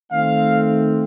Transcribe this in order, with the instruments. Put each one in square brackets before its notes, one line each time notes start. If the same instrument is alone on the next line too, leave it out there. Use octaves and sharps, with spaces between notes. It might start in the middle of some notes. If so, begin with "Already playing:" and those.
[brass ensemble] D#3 A3 C4 F5